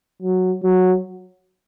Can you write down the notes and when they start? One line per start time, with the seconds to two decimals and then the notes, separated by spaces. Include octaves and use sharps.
0.23 F#3
0.63 F#3